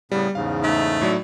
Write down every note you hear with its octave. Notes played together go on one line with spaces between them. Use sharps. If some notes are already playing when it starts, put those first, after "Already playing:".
A2 C#3 G3 B3
E2 G#2 C#3 F5
A3 D#4
A2 F#3 D5